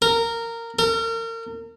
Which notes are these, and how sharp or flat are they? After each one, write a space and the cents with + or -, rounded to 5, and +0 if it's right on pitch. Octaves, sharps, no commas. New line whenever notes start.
A#4 -15
A#4 -35